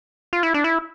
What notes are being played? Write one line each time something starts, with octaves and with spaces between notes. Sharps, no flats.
F4
E4
D4
E4